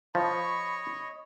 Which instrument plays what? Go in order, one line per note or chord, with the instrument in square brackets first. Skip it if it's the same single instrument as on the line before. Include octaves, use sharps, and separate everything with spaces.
[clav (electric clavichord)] F3 [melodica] C#5 D#5 [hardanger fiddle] B5 C#6